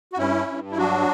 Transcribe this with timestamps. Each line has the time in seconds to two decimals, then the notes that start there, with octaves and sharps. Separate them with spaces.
0.13 F#4
0.18 G2 C#4 E4
0.48 G2
0.72 E4
0.77 F#3 D4 F#4